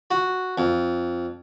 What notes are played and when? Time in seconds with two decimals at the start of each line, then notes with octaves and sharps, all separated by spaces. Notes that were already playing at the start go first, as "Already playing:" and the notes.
0.11 F#4
0.58 F2